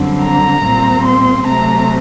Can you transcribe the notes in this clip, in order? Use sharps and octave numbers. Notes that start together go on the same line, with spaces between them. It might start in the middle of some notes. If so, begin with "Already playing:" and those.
Already playing: F#2 D3 G3 C4
A#5
A#2 G3 C4
C6
C3 F#3 A3 C4 A#5